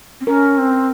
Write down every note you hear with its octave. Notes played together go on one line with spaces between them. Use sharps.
C4
C#4 A#4
C4